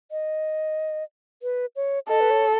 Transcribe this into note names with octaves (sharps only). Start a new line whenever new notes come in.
D#5
B4
C#5
A4 D#5
B4
C#5